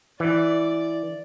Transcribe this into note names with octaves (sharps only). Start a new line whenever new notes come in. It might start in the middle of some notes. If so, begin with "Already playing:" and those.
E3 D5